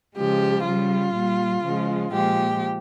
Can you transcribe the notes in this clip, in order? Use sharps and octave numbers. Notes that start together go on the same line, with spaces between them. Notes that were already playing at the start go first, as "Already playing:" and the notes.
C#3 F3 G#3 G4
C#3 G3 F4
A#2 G3
C#3 F3 G#3
A#2 F3 G#3 G4